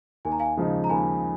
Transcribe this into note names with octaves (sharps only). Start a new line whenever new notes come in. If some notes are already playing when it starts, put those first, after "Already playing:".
D#2 G#5
A#5
F5 G#5
C#3 F3 G#3 D#4
A#5
D#2 G#5 B5